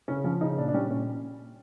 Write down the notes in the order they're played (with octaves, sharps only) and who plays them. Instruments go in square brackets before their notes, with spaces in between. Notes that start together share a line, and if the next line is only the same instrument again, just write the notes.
[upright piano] C#3 C#4
F3 C#4
C#3 D#4
A#2 D4
D4
G3 C#4
A#2 C#4